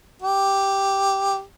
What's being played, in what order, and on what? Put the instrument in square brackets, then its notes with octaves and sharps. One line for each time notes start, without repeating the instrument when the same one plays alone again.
[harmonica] G4